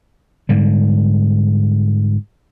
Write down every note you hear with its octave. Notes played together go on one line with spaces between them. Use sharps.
G#2 D3 G3